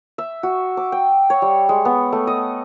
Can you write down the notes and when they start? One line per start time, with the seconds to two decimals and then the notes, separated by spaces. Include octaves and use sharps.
0.18 E5
0.43 F#4
0.77 D6
0.92 G5
1.30 C#5
1.42 G3
1.69 G#3
1.85 B3
2.12 A3
2.27 D#5